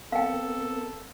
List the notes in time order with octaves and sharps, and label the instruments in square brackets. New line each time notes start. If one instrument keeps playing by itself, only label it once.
[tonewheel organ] B3 C4 A#4 [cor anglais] A4 [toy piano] F5 G5